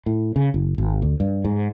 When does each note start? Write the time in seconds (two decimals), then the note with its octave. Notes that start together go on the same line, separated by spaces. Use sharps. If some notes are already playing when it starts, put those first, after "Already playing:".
0.06 A2
0.36 C#3
0.54 F#1
0.78 G#1
1.02 D2
1.20 G2
1.45 G#2